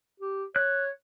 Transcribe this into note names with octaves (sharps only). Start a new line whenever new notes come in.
G4
C#5 F#6